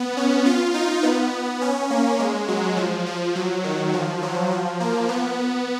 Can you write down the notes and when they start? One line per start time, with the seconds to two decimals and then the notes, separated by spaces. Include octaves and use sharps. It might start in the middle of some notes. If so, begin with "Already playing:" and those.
Already playing: B3
0.17 C#4
0.45 F4
0.74 D#4
1.03 B3
1.61 C#4
1.90 A#3
2.20 G#3
2.48 F#3
2.77 F3
3.06 F3
3.35 F#3
3.64 D#3
3.94 F3
4.22 F#3
4.52 F3
4.80 A#3
5.08 B3